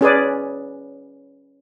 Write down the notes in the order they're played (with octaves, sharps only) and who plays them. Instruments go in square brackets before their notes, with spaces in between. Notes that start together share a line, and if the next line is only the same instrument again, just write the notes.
[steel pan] C#4 G#4 B4 D5